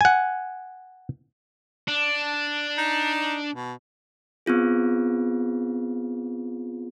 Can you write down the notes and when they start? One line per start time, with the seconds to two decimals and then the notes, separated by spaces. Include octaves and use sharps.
0.01 F#5 G#5
1.88 D4
2.78 D#4
3.55 B2
4.46 B3 C4 F4 G#4